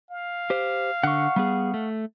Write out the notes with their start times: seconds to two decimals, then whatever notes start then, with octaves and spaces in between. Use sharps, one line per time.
0.11 F5
0.50 G4 C5
1.04 D3 F#5 C#6
1.36 G3 B3 G#4
1.74 A3